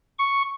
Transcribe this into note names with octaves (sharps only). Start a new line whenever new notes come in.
C#6